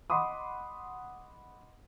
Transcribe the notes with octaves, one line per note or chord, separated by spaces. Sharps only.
D#5 F#5 B5 C6 D6 D#6